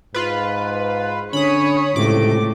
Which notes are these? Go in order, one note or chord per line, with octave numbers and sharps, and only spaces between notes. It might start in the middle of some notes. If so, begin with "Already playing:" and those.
G#2 F4 B4
D3 C#4 C#5 B5 D#6
C#2 A2 C3 D6